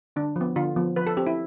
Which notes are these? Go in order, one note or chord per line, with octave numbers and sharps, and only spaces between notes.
D3 D4
F3
B3
D3 F4
F3 B3
F3 B4
A4
C4 G4
E4